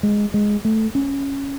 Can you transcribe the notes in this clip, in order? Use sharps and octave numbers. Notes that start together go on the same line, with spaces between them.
G#3
G#3
A3
C#4